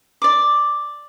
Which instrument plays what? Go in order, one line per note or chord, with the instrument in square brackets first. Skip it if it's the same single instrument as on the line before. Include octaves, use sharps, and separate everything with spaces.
[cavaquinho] D5 D6